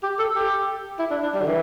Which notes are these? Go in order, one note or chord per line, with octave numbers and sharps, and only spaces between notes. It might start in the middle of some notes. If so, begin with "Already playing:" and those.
G4
A4
G4
E4
D4
D4
G3
D3
E3